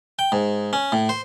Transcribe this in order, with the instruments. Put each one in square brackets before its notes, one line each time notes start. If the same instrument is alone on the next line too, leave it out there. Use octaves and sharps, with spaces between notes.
[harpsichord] G5
G#2
C#4
A2
C5